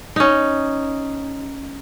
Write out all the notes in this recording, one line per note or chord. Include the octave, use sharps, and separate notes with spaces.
C#4 D#4